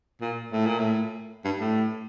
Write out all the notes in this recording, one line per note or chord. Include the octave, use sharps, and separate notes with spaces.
A#2
A2
A#2
A2
G2
A2